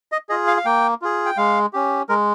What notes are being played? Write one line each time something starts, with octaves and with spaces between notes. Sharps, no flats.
D#5
F4 G#4 D#5
F5
F5
A#3 G5
F4 G#4
G5
G#3 F5
C#4 G4
G#3 A#4